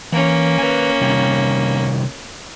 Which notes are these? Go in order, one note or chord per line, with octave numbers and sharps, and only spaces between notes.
E3 A#3 C#4
B4 G#5
C3 D#3 G3